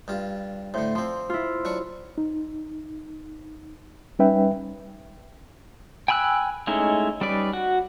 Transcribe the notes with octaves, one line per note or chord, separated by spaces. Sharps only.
G2 F4
A2 D3 C5
F3 C4 C6
E4 F4
F#3 D4 C#6
D#4
G3 C#4 D#4 B4 E5 G5
G5 G#5 B5 E6 F#6
G#3 A3 C#4 D#4 E4
G3 C#4 D#4 B4 D5
F#4